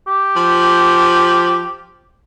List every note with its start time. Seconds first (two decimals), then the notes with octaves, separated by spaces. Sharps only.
0.08 G4
0.36 F3